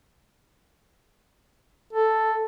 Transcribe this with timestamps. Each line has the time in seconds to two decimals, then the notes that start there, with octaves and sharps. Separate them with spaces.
1.93 A4